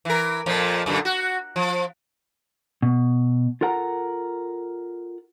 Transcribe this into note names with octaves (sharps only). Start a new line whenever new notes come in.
E3 A#4
F2 A#2 F3
F#2 A#2 D3
F#4
F3
B2
F4 A4 A#4 F#5 A#5